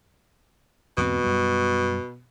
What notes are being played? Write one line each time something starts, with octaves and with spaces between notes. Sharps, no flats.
E2 G#2 B2 C4
F#2 G3